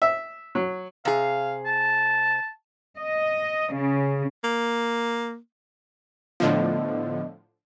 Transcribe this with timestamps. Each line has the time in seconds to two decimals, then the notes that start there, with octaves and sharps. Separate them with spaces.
0.02 E5
0.55 F#3
1.05 C3 G#4 F5
1.66 A5
2.98 D#5
3.74 C#3
4.44 A#3
6.40 A2 D3 F3 B3 D#5